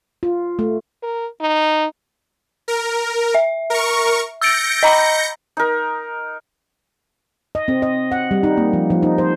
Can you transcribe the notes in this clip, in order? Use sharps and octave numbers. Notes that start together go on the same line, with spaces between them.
F4
A3
A#4
D#4
A#4
E5
A#4 C#6
E6 G6 A6 A#6 C#7 D7
D#5 A#5 B5
D#4 A#4
D#5
C4
D#5
F#5
G3
D#4
A#3
F3
F3
D#4
C5